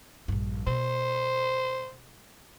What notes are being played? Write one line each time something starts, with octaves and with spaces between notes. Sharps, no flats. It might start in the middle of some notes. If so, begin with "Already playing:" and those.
A#1 G2
B2 C5